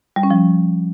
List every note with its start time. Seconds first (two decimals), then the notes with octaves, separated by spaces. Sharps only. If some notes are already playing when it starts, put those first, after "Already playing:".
0.16 G3
0.23 C#4
0.31 F3